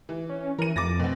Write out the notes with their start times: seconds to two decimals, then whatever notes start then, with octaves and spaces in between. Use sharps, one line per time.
0.09 E3
0.29 C#4
0.59 E3 A#4 D#7
0.76 F2 D6 A6 A#6
0.99 B2 C4